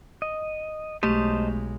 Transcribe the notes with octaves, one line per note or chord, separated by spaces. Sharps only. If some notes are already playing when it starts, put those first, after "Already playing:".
D#5
B1 G#3 A3 G4 C5 D#5 A5